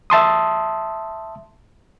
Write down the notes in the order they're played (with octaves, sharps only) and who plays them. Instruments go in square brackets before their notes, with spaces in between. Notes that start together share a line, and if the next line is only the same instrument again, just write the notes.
[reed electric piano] E5 A5 C6 D#6